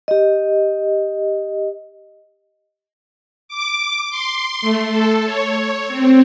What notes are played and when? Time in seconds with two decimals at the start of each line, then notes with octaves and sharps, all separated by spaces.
0.08 G4 D#5
3.48 D6
4.10 C6
4.61 A3
4.92 A4
5.25 C#5
5.88 C4